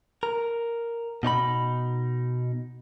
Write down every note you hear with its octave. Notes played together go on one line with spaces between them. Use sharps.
A#4
B2 D#4 C#5 B5